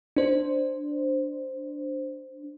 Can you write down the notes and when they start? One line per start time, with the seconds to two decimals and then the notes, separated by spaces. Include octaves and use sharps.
0.16 D4 C5